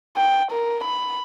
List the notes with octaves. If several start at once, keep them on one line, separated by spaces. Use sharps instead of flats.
G5
A#4
B5